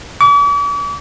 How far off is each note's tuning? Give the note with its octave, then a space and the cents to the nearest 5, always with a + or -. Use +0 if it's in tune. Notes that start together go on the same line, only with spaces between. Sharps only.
D6 -45